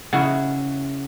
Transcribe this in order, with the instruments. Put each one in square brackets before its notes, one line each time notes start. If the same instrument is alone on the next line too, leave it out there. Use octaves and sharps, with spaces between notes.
[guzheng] C#3 E4 F#4 [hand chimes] F#5